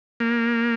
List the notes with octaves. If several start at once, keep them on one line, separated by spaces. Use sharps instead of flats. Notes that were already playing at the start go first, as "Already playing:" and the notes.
A#3